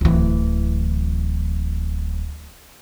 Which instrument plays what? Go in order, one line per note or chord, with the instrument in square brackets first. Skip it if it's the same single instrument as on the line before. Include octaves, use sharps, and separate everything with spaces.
[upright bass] D1 E3